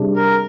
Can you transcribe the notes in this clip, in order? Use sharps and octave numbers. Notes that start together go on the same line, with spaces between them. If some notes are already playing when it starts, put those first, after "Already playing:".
Already playing: C3 G3 D4 G#4
A#4